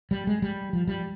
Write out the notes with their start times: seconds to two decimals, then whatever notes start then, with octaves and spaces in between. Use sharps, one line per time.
0.11 G3
0.27 G#3
0.42 G3
0.73 F3
0.87 G3